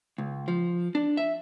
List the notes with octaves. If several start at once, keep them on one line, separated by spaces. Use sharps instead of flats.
C#2
F3
D4
E5